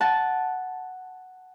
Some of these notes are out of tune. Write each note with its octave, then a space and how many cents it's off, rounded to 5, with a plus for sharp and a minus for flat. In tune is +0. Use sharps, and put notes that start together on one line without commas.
F#5 +0 A5 -5